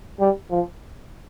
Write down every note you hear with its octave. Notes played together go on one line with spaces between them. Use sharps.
G3
F3